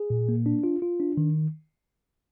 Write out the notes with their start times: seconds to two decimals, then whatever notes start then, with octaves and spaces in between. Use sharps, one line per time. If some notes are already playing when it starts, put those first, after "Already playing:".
Already playing: G#4
0.10 A#2
0.29 A#3
0.46 D4
0.64 F4
0.82 F4
1.00 D4
1.17 D#3